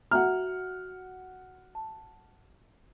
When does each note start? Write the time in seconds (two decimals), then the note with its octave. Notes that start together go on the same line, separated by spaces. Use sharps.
0.11 F#4 E5 F#5 A#5 F6
1.75 A5